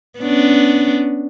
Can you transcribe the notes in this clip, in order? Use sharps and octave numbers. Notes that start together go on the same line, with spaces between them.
B3 C#4 D4